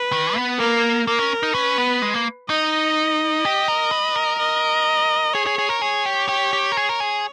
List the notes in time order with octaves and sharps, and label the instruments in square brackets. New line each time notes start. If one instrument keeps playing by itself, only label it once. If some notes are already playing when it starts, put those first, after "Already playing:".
Already playing: [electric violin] B4
[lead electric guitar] D#3
B3
[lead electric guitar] A#3 [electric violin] A#4
[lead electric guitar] A#3 [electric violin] A#4
[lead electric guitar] C#4
D#4
[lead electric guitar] C#4 [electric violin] B4
[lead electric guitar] B3
G#3
A#3
[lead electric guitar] D#4 [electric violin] D#5
[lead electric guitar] G4
A#4
B4
A#4
[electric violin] D#5
[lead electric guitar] G#4 [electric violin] C#5
[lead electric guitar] G#4
G#4
A#4
[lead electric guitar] G#4 [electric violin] C#5
[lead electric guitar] G4
G4
G4
A#4
G#4
A#4
G#4